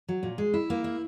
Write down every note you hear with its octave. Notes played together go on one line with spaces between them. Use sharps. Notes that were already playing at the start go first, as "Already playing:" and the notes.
F#3
A#2
G#3
E4
A#3
E4